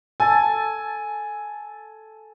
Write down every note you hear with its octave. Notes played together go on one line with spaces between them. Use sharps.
A4 G#5 A5